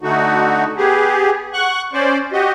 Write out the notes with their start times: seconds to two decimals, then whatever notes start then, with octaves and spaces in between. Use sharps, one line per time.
0.01 D3 A3 D#4 F#4
0.77 B3 G4 G#4
1.53 F#5 C#6 F#6
1.93 C#4 C5 D5
2.32 F#4 G4 D#5